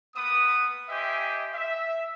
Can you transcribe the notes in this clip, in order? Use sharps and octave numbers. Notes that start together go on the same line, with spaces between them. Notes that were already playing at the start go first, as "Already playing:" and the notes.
A#3 B3 B4 D#6
G4 C5 D#5 E5 G5 G#5
E5